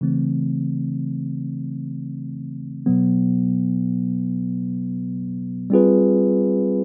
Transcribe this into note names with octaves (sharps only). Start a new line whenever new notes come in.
C#3 E3 A3 C4
B2 F#3 B3
G3 C4 F4 G#4 B4